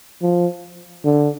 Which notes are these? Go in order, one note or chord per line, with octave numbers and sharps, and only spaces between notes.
F3
D3